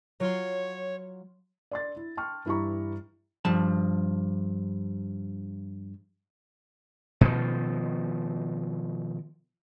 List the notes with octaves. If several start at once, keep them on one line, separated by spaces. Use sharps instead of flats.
F#3 F4 C#5 C6
D5 C6 A6
E4
G5 A5 C6 C#6 F6
G2 E3 E4 G4 A#5 C#6
G2 F3 A5
B2 D#3 F3